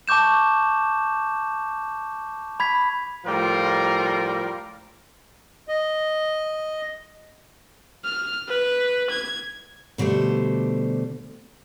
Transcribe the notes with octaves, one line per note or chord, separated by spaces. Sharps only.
A5 C#6 D6 G6 E7
B5 G#6 B6
A2 F3 G3 F4 A#4
D#5
F6
B4
G#6
B2 D3 G3 A3 C5